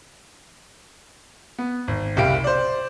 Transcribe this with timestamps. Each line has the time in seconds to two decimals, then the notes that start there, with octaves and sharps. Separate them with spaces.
1.58 B3
1.88 G#1
2.16 F#1 C2 G4 F5 D7
2.44 C5 D5